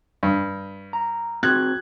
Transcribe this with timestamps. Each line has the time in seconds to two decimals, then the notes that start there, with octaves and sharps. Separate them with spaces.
0.23 G2
0.93 A#5
1.43 C4 F#4 G#4 F#6 G#6